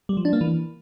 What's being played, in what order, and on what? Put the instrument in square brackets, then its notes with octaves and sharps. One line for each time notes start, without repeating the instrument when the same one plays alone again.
[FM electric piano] G3
F3
D4
A#3
E3